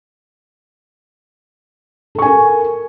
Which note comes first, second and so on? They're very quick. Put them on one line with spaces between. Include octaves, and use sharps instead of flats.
A4 C#6 G#5 A#4